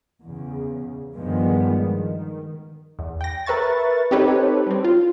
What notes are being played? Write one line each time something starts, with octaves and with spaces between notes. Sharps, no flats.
E2 C#3
G2 D#3 F3 G#3 B3
D#3
E2
G5 A#6
A#4 B4 E5 C#6 A6
C4 D#4 G4 A4 B4 C#5
G3 C4
F4